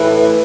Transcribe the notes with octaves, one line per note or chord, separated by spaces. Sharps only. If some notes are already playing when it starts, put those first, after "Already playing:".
Already playing: A2 E3